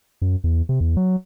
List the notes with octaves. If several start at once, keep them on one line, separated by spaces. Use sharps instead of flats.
F#2
E2
C3
E2
F#3